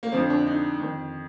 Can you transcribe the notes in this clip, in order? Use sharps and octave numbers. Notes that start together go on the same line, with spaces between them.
A#3
F2 D3 F3 C4
D4
D#4
F2 D#3